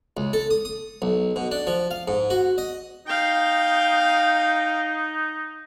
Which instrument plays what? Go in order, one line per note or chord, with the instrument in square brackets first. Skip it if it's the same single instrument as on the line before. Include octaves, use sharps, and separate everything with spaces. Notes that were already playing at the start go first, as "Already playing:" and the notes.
[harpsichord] C#2
A4
D#6
D#6
B1
B2
D4
F3
F5
G#2
F#4
D#5
[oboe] D#4 [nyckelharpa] F5 G5